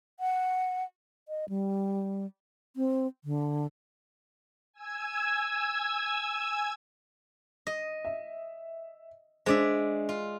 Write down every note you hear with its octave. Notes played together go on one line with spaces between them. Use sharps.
F#5
D#5
G3
C4
D3
G#5 E6 G#6
D#5
E5
G#3 D4 C5 D5 E5
F4